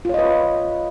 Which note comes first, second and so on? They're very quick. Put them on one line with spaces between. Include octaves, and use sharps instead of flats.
F4 C#5 D#5 B4